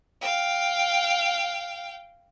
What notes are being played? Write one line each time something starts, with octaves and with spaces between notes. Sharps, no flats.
F5 G5